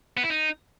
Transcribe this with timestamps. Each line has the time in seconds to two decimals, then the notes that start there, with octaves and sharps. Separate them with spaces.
0.17 B3
0.24 E4
0.30 D#4